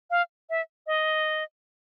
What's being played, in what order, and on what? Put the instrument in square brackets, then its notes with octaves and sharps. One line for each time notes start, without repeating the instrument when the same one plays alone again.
[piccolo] F5
E5
D#5